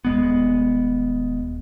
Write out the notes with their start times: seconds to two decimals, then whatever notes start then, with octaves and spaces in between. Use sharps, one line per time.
0.05 D#1 G#3 B3